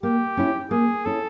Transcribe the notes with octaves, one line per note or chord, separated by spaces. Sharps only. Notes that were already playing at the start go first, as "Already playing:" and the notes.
A#3 G4
C#4 E4
A#3 G#4
C#4 E4 A4